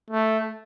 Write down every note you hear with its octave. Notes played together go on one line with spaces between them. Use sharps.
A3